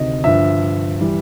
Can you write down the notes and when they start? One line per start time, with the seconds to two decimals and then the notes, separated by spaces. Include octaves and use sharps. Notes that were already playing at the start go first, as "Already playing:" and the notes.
Already playing: D2 C3 D#3 D#5
0.24 G2 D3 F3 E5
1.01 E3 G3